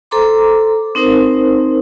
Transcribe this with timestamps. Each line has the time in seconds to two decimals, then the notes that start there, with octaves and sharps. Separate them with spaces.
0.11 A4 C5 A#5 C6 D6
0.95 C4 D#4 A#4 C5